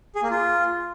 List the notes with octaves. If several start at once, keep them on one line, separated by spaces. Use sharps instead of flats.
G#4
A#3
F4